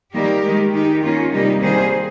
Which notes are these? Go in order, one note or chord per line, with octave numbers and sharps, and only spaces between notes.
D#3 G3 A#3 G4 A#4
D#3 G#3
D#3 G#3 D#4 G4
D#3 A#3 C#4 F4
C3 G3 A#3 D#4 G4
D#3 G3 A#3 G#4 C5